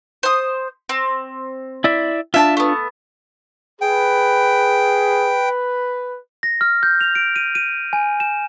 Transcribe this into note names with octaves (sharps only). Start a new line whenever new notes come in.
C5 D#6
C4
E4 D5 E5
D4 F4 E5 G#5 A5
A3 B3
G#4 B4 G5
A#6
F6
G6
F7
D7
D#7
D#7
G#5
E7